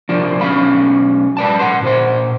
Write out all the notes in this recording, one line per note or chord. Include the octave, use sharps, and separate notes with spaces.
C2 F3 D4
B1 F#2 C#4 F5 B5
B4 D5 A5
A#2 F#5 C6
A#2 C5 C6